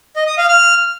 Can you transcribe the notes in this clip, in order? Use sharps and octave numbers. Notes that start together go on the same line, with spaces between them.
D#5
D#6
F5
F6